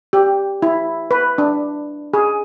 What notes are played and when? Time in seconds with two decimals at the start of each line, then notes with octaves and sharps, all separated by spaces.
0.13 G4
0.62 E4
1.11 B4
1.38 D4
2.14 G#4